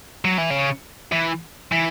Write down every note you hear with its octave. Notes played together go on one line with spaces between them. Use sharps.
F#3
E3
C#3
E3
E3